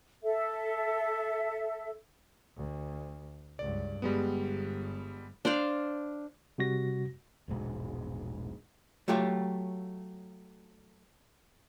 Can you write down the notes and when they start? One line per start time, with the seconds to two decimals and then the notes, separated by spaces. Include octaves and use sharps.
0.23 A4 E5
2.56 D2
3.59 C#2 G2 D5
4.02 G1 G3 G#3 B3
5.45 D4 C5 D5 F5
6.58 C3 G3 F#4 A#6
7.48 E1 A#1 G#2 B2
9.08 F#3 A3 F4 G4 C#5